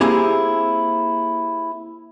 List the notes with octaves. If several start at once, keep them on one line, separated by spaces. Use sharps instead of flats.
A#3 C4 E4 G4 G#4